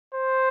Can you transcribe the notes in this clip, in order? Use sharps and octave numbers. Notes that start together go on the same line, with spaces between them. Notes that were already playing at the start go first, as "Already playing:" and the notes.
C5